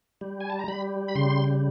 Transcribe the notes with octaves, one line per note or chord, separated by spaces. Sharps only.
G3
G#5
A5
A#5
G3 B5
B5
C#3 C6